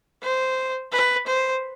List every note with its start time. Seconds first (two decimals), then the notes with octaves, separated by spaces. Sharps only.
0.23 C5
0.92 B4
1.27 C5